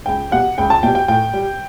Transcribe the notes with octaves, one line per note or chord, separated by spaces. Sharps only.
C#2 G5
B2 G3 F#5
C#2 G5
A5
B2 G3 G5
G5
A2 G5
G3